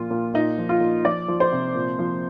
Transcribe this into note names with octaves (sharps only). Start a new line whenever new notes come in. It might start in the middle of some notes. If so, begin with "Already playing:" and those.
Already playing: A#2 F3 F4
A#2
A#2 D#4
F3
F4
A#2
F3 D5
F3
C5
C3
A#2
F3